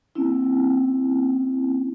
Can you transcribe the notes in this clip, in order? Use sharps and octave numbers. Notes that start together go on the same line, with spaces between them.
A#3 C4 C#4 E4